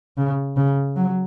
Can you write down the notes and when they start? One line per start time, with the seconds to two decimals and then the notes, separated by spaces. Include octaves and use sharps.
0.17 C#3
0.56 C#3
0.96 F#3